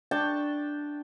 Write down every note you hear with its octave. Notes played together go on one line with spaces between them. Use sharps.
D4 G5 A5 C#6